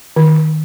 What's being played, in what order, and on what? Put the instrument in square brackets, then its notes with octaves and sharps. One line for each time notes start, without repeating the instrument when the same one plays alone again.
[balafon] D#3